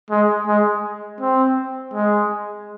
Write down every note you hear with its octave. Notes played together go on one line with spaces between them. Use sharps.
G#3
G#3
C4
G#3